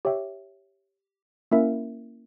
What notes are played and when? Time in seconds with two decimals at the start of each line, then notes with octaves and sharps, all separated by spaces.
0.05 G4 C#5 E5 G5
1.52 A#3 C#4 E4 A#4 E5